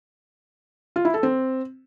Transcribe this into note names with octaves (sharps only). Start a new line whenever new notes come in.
F4
E4
A4
C4